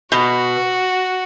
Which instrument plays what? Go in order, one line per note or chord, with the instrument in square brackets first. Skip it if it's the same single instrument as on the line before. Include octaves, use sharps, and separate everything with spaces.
[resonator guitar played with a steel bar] B2 [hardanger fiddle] F#4